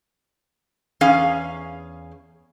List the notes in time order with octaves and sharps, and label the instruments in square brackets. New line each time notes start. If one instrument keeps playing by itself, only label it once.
[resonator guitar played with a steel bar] E2 C#4 G#4 F5